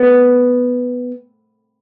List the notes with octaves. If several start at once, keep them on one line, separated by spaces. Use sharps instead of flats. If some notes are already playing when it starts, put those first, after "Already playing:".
Already playing: B3